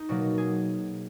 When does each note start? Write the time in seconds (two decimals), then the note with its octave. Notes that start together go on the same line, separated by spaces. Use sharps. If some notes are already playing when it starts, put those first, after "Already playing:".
Already playing: D#4
0.09 B2 F#3 A#3 F#4
0.38 G#4